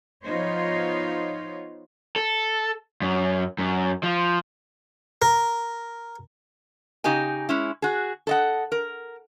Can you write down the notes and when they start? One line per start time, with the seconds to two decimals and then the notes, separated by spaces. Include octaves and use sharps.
0.24 F3 B3 D#4 F4 C5 C#5
2.16 A4
3.02 F#2
3.58 F#2
4.03 F3
5.22 A#4
7.04 C#3 D#4 G4 D#5 G#5
7.49 G#3 C#4 E4
7.82 F#4 G#4
8.27 A4 D#5 F#5
8.72 A#4